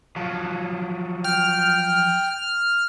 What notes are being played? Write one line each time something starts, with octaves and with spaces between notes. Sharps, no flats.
F3 F#3
G5 F6